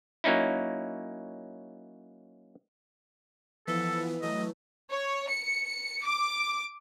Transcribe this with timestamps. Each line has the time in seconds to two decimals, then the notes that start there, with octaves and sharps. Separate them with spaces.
0.24 F#3 A#3 C#4 D#4 E4
3.67 E3 F3 B3 E4 A4 B4
4.22 E3 F#3 A3 D#5
4.90 C#5
5.29 C#7
6.03 D6